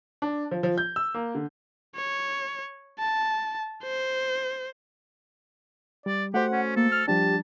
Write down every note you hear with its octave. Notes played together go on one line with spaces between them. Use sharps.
D4
F3
F3
G6
E6
A#3
D3
C#5
A5
C5
G3 D5
A3 F#4 G4 C5 F#5
C#4
A#3 A4
F6
F3 G3 D4 G4 A5